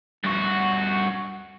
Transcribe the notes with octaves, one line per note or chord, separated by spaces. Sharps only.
G2 F#4